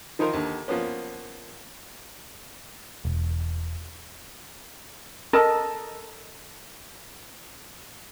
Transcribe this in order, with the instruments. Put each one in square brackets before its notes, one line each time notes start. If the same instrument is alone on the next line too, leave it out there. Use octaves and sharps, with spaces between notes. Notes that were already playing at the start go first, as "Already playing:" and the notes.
[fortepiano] D#3 F3 D#4 A#4 C5
D#2 D3
F3 A#3 B3 C#4
[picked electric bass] E1
[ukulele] A4 A#4 D#5 A5